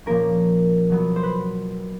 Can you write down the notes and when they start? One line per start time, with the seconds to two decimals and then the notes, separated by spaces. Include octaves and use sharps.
0.06 A#2 F3 A#3 C#4 A#4
0.90 B2 F#3 B3
1.16 C5
1.23 B4